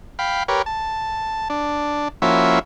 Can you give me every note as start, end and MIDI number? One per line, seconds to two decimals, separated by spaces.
0.19 0.43 77
0.19 0.43 79
0.19 0.43 83
0.48 0.62 67
0.48 0.62 70
0.48 0.62 71
0.48 0.62 73
0.66 1.48 81
1.50 2.08 62
2.22 2.59 53
2.22 2.59 58
2.22 2.59 61
2.22 2.59 64
2.22 2.59 66
2.22 2.59 76